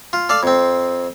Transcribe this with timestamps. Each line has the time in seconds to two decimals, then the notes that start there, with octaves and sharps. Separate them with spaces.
0.13 F4
0.29 A4 D5 F5
0.43 F2 C4